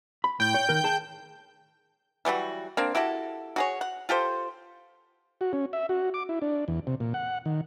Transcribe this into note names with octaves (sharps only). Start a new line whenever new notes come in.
B5
A2 G5 G6
C#5
D#3 A#4
G#4 A5
E3 F#3 G3 F#4
A#3 C4 D4
E4 F#4 G4 A4
F#4 G#4 C#5
F#5
F4 G4 A4 C5
F#4
C#4
E5
F#4
D6
E4
D4
E2
C3
A#2
F#5
D#3